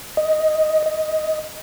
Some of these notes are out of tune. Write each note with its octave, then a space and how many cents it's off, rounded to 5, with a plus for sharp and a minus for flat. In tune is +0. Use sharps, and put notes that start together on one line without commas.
D#5 +5
D#5 +10